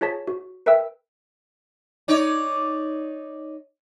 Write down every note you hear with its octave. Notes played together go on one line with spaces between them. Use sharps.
F4 G#4 C#5 A5 B6
F#4
A#4 B4 E5 G5 E6
D#4 C#5 D5